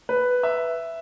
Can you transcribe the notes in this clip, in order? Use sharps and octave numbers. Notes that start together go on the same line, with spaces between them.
B4
E5